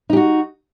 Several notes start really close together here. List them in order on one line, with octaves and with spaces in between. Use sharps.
D#4 G4 F#4